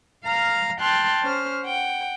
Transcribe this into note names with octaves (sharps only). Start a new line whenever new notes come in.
F5 A#5 F6
G5 A5 C6 F6 F#6
C#4 C5 F6
F#5 G5